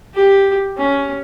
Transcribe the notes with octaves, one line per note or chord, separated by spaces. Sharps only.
G4
C#4